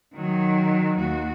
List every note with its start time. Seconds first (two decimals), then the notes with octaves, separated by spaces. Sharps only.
0.15 D#3 F#3
0.98 D#2 F#4